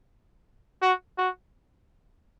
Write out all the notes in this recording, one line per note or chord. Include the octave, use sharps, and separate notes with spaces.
F#4
F#4